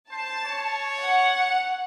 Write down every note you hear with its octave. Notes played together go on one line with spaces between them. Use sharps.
C5 A5
C#5
F#5